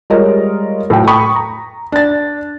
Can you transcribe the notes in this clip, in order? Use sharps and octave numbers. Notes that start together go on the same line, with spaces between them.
G3 G#3 F4 A#4 C#5 D#5
A2 F#3 G5
G5 A5 B5 C#6 D#6
A#5
D4 A6